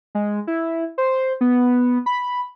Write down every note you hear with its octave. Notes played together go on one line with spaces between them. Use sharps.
G#3
E4
C5
B3
B5